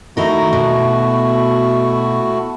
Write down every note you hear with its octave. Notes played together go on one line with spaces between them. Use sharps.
D#3 A3 D#4 E4 F#4 A#4
B2